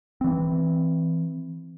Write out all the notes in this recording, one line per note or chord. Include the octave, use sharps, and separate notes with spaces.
E3 C4